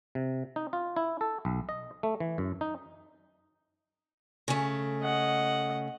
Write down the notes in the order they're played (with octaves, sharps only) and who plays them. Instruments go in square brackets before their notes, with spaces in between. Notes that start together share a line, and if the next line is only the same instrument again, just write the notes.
[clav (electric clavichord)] C3
D#4
F4
E4
A4
B1
D#5
A3
E3
F#2
D#4
[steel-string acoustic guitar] C#3 A3
[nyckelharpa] D#5 F#5